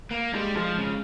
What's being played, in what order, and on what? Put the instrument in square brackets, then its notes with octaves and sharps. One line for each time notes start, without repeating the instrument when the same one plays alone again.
[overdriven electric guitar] A#3
[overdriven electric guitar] G3 [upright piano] G#3
[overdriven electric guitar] F3 [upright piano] G#3
[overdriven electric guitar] C#3